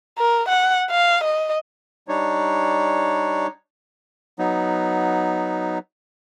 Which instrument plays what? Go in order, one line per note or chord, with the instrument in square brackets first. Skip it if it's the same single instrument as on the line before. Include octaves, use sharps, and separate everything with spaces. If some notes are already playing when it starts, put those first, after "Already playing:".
[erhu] A#4
F#5
F5
D#5
[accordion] G3 D4 D#4 C#5
[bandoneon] F#3 B3 D#4